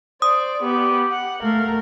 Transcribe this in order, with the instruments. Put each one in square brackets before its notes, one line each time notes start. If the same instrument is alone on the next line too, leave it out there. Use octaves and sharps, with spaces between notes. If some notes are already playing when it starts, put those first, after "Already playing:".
[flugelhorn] C5 [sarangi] D5 [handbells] D#6
[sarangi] B3 [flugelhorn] G4
[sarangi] F#5
[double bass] A3 [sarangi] A#4 [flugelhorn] F5